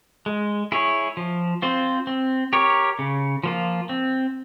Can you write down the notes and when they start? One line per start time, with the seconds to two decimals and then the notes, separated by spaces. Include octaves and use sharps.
0.26 G#3
0.72 E4 G#4 C#5
1.17 F3
1.62 C4 F4 C5
2.07 C4
2.53 G4 A#4 C#5
2.99 C#3
3.44 F3 A#3 F4
3.89 C4